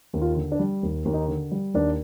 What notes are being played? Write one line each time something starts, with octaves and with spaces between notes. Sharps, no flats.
D#2
F4
D3
D4
G3
D#2
D#2
D#4
D3
G3
D#2 D4